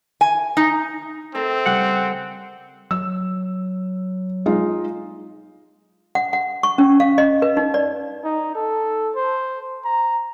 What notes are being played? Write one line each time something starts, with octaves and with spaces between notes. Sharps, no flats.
G#5
D#4
C4 A4 A#4 E5
C#3 G3 G4 F#5
F#3 E6
G#3 D#4 F4
F#5
F#5
C#6
C#4
F5
D#5
B4
D#4
D5
D#4
A4
C5
A#5